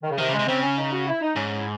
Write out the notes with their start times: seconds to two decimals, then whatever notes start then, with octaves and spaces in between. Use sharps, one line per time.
0.03 D#3
0.11 C#3
0.18 C3 D#3
0.29 C#3
0.33 G#3
0.39 C3
0.47 C#3 C4
0.63 C#4
0.78 D#4
0.92 F#4
1.07 E4
1.22 D#4
1.36 G#2 C#4
1.57 E4